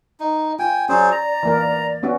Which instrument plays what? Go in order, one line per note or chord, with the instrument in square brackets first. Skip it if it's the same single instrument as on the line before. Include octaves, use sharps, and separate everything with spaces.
[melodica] D#4
[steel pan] F4 [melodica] G5 G#5
[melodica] F#3 G#4 C5 [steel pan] C#4 [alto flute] D5
[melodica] A#5
[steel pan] E3 A#3 A#4
B3 C#4 F#4